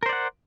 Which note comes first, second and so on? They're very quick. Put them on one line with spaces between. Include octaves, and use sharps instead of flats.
A#4 C5 D5 F#5